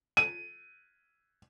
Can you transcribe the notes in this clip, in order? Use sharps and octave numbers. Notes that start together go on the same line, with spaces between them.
D#7